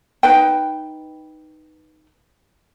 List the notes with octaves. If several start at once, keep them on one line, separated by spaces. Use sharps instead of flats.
D#4 B4 G5